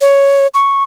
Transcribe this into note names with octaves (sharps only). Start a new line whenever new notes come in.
C#5
C#6